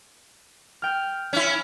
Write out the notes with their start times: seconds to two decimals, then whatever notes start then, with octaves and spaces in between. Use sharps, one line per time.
0.82 G5 F6
1.33 C#4 E4